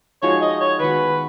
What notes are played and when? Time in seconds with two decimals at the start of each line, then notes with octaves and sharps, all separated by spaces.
0.22 F3 G#3 D#4 F#4 C#5
0.42 D#5
0.61 C#5
0.79 D#3 G#3 B3 F#4 B4